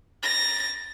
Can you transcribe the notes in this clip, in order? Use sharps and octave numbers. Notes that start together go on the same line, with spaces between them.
A6 A#6